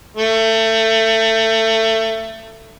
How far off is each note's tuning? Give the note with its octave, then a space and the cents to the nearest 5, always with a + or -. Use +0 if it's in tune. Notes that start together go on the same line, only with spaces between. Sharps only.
A3 +25